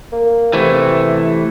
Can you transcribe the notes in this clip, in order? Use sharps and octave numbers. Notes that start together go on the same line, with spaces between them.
A#3
C3 E3 A3